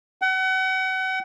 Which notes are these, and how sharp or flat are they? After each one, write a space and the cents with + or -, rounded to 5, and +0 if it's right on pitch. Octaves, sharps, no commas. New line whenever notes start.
F#5 +35